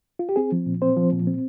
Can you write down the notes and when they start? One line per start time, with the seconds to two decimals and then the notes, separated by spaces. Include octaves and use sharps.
0.19 F4
0.29 G4
0.36 C4 G#4
0.52 F3
0.66 A#2
0.82 C4 C5
0.96 F3
1.12 A#2
1.27 C4